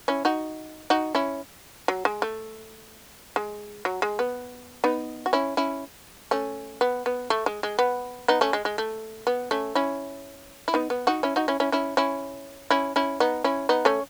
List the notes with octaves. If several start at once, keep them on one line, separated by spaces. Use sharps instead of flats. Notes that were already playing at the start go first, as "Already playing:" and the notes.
C#4 E4
D#4 F#4
D#4 F#4
C#4 E4
F#3
G#3
A3
G#3
F#3
G#3
B3
B3 D#4
F#4
C#4 E4
C#4 E4
A3 C#4
B3
B3
A3
G#3
G#3
B3
B3 D#4
A3 C#4
G#3
G#3
A3
B3
A3 C#4
C#4 E4
E4
B3 D#4
B3
D#4 F#4
C#4 E4
D#4 F#4
C#4 E4
C#4 E4
C#4 E4
C#4 E4
C#4 E4
C#4 E4
B3 D#4
C#4 E4
B3 D#4
A3 C#4